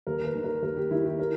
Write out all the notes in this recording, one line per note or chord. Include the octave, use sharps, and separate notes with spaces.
D#2 A#4
B4
D#3
A#4
D#2 A#4
G4
D#3 E4
G4
A#4